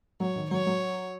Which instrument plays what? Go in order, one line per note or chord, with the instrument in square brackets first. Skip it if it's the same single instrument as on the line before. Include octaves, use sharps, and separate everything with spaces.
[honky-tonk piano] F#3 [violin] C#5
[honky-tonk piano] D#3
[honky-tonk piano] F#3 [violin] C#5
[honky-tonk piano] F#3